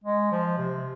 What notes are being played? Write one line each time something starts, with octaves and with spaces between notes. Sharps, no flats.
G#3
F3
C3